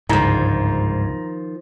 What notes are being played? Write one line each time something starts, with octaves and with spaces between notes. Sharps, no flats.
G1 C#2 G#2 D#3 F3 A#5